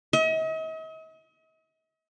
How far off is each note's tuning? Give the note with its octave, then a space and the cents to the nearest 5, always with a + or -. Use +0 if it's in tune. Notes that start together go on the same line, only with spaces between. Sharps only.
D#5 +45